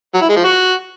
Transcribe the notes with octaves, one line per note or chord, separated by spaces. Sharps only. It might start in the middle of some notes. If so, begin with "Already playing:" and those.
F#3
E4
G#3
F3
F#4